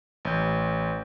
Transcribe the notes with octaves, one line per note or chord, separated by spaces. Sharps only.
A1 G6